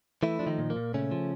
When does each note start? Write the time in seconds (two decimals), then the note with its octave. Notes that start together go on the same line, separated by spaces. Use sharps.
0.23 E3 A3 E4
0.39 F3 D4
0.47 D#3 D#4
0.58 A#2
0.70 A#3
0.76 A#2
0.94 C#3 A3 C#4
1.11 F3